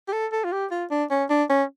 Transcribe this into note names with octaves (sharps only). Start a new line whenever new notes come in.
G4
A4
A4
F4
G4
F4
D4
C#4
D4
C#4